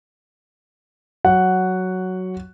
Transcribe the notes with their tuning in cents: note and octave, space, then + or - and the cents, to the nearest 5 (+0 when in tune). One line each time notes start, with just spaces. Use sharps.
F#3 +5 F#5 +0